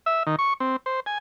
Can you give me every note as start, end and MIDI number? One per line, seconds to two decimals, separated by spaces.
0.06 0.23 76
0.27 0.36 51
0.39 0.53 85
0.60 0.76 60
0.86 1.00 72
1.06 1.18 80